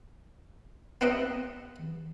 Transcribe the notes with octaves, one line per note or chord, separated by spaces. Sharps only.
B3 C4 D#4 B4 D#5 E5